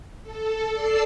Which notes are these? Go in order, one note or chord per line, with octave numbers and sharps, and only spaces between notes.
A4
A4 D5 E6 C7